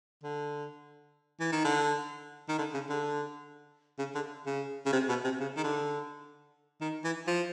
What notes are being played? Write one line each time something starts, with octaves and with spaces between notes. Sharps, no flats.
D3
E3
D#3
D3
D#3
D3
C#3
D3
C#3
D3
C#3
C#3
C3
B2
C3
C#3
D#3
D3
D#3
E3
F3